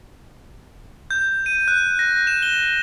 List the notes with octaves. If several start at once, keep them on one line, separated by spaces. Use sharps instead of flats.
G6
D#7
F#6
A#6
E7
G7